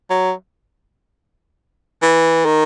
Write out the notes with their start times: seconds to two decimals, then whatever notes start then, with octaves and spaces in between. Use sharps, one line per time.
0.10 F#3
2.02 E3
2.45 D#3